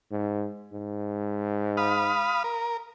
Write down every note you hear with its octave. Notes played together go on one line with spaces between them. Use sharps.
G#2
G#2
F5 B5 D#6
A#4